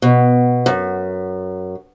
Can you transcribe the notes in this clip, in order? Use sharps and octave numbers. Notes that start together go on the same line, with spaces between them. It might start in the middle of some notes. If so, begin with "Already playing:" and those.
B2
F#2